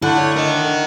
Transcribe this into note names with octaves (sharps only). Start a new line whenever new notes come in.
D3 A3 E4 F#5
C#5
A#4 D#5